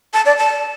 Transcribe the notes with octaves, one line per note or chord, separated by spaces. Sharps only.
A5
D5
A5